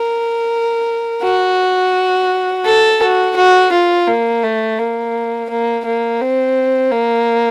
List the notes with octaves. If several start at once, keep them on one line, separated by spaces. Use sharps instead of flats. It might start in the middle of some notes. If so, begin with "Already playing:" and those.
Already playing: A#4
F#4
A4
F#4
F#4
F4
A#3
A3
A#3
A#3
A#3
C4
A#3